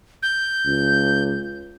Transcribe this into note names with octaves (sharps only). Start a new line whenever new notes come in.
G6
C#2